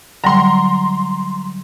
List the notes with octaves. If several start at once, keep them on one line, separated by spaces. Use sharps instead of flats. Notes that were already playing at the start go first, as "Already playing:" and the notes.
D3 F#3 G3 A#5 C6